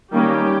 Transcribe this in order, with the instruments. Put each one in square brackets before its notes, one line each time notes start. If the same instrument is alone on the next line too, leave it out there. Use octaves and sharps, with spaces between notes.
[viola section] D#3 G3 A#3 C#4 G4